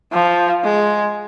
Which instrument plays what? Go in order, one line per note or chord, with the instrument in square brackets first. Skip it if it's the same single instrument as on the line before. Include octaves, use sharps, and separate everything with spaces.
[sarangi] F3
G#3